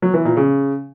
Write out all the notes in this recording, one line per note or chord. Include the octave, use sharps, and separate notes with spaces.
F#3
E3
A#2
C#3